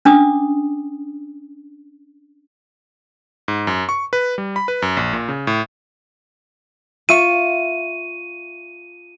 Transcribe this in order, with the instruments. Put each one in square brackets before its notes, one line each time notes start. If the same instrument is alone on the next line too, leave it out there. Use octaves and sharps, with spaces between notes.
[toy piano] C#4 D4 D6 D#6
[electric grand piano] G#2
F#2
C#6
B4
G3
B5
B4
F#2
A#1
A#2
C#3
A2
[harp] F4 E5 C#6 [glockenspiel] D#7